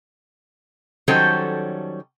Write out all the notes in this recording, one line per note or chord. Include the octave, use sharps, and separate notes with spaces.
D#3 F#3 G3 C#4 A4 C5